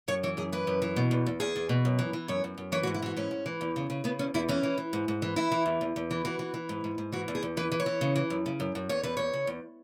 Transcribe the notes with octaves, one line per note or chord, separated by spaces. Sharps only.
F#2 C#5
E3 C#5
F#2 G#4
E3 B4
F#2
E3
B2
E2
E2
E2 G#4
E2
B2
F#2
E3
E3
F#2 C#5
F#2
F#2
E3 C#5
F#4
G#2
E4
E3 F#4
G#2 C#4
G#2
E3
E2
C#3
C#3
C#3 B3
E2 C#4
E2 E4
E3 C#4
E3
E3
G#2
G#2
E3
E3 E4
E3
E2
E2
E2
E3
E3 F#4
E3
E3
G#2
G#2
G#2
E3 F#4
E2
G#4
E2
E3 B4
E3
C#5
E3
C#3
E3
F#2
C#3
F#2
F#2
E2 C#5
E2 B4
E2 C#5
C#3
E2